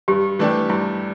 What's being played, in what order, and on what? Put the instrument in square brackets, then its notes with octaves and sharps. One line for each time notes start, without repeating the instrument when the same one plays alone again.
[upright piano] G2 [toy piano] G4
[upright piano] E3 A3 D4 G4
[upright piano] G2 [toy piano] E4